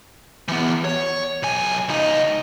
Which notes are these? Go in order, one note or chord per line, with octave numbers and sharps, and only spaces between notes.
E3 B3
C#5
B1 G#5
C#2 D#4